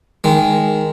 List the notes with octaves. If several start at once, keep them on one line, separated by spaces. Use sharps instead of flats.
D#3 G#3